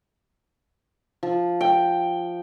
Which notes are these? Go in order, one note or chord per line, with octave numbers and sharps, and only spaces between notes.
F3
G5